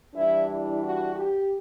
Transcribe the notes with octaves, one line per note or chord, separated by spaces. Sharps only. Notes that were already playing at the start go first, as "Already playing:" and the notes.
E3 G3 D4 E4
E4
F#4
G4